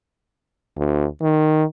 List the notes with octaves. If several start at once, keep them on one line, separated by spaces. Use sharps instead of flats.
D2
D#3